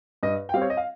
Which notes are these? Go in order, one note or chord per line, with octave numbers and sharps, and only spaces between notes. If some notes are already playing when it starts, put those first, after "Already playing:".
G2 D#5
G5
G3 C4 F5
C#5
D#5
F5